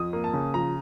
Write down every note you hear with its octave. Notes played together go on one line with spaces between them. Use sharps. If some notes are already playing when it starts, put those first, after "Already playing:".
Already playing: F2 D#6
A#3
A5
C#3
F3 A#5